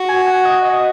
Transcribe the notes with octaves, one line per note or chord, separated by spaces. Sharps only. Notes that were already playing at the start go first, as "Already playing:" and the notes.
Already playing: F#4
G#5
F#5
D#5
D#5